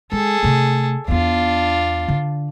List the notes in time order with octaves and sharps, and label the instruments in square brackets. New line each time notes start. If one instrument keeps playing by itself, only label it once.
[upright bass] G#3 [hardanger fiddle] G#4 A4
[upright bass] C3 A3
[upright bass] E2 B3 [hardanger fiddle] D4 F4
[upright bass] D3